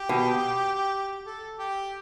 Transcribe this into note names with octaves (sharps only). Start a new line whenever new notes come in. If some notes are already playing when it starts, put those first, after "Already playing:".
Already playing: G4
B2
A4
G4